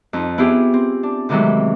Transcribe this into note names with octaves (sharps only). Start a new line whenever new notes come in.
F2 D#4
B3 E4 F4 G4 G#4
C4
D4
A2 C3 D#3 E3 F#3 G#3